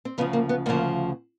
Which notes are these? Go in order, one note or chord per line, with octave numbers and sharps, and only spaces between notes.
C4
D2 C#3 F3 B3
A#3
B3
D2 C#3 F3 A#3